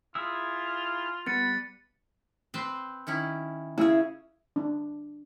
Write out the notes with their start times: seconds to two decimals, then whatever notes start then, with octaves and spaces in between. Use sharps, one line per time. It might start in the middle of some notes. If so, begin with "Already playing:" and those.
0.15 E4 F4 G#4 E6
1.27 G3 B3 B4 A6 C#7
2.54 C4 B4 C5
3.07 D#3 C#4 E4
3.78 C#3 E4 G#4
4.56 D4